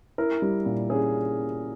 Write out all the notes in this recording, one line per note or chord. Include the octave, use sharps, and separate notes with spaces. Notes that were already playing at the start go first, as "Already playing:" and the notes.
E4 A#4
G3
A#2
C#4 G#4